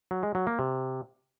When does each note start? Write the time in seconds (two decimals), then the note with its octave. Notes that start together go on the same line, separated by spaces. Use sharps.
0.11 F#3
0.23 G#3
0.35 F#3
0.47 A#3
0.59 C3